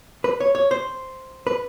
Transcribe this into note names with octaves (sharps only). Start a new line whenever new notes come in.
B4
C#5
C#5
C5
B4